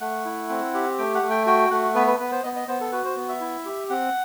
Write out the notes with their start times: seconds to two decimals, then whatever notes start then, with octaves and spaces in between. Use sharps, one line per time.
0.01 A3 F#5
0.25 E4
0.49 C4
0.74 G4
0.98 A3 G5
1.15 F#5
1.22 A3
1.30 G5
1.46 F#4 G5
1.71 A3 F#5
1.95 B3 B4
2.07 B4
2.19 B3 B4
2.32 C5
2.44 B3 D#5
2.56 D#5
2.68 B3 C5
2.81 A4
2.92 F#4 B4
3.05 C5
3.16 B3
3.29 E5
3.41 E4
3.65 G4
3.90 C4 F#5